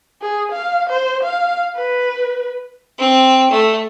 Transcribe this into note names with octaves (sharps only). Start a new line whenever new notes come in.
G#4
F5
C5
F5
B4
C4
A3